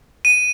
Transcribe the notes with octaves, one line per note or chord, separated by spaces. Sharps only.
D#7